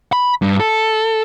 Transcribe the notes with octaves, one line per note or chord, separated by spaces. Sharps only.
B5
G2
A4